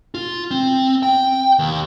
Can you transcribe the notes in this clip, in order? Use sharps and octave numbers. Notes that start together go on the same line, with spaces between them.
F4
C4
G5
D#2